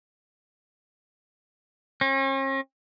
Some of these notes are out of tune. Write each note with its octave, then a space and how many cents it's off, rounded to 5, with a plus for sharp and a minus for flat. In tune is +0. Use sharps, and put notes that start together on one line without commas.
C#4 -45